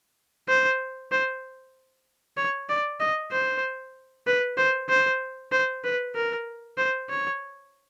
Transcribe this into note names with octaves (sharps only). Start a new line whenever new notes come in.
C5
C5
C#5
D5
D#5
C5
B4
C5
C5
C5
B4
A#4
C5
C#5